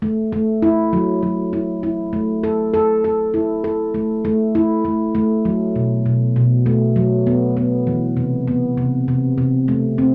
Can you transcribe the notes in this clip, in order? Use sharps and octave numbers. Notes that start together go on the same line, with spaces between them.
A3
A3
E4
F#3
F#3
E4
E4
A3
A4
A4
A4
E4
A4
A3
A3
E4
A3
A3
F#3
B2
B2
B2
A3
F#3
B3
B3
E3
C3
B3
C3
C3
C3
A3
C4